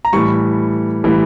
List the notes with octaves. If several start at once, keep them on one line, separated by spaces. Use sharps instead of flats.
A#5
A2 E3 G3 C#6
A2 E3 G3